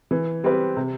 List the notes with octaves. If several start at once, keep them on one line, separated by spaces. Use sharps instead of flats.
E3
G3 C4 G4 B4
C3